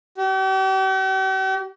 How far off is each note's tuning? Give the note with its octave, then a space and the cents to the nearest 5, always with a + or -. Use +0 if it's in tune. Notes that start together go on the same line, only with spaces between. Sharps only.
G4 -45